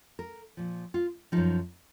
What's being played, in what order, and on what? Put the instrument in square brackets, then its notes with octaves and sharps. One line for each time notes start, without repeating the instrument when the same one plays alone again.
[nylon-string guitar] A#4
A#2 F3
F4
F#2 F3 D#4